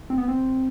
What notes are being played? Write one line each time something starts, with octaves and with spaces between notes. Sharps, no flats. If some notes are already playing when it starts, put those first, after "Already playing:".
C4
B3
C4